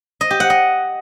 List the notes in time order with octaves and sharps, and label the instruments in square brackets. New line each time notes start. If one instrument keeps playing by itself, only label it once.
[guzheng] D#5
G4
F#5
D#5